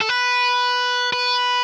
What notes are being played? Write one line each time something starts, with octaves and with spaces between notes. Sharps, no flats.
A4
B4
B4